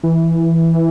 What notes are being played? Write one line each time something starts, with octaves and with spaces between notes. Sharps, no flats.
E3